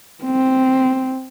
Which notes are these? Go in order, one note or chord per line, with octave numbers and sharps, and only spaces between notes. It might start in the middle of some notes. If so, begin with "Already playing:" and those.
C4